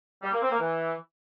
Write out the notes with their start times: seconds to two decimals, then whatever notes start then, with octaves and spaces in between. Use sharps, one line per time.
0.23 G3
0.32 A#3
0.41 C4
0.51 A#3
0.60 E3